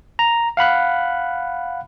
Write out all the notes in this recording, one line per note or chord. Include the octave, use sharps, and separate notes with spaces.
A#5
F5 F#5 B5 F#6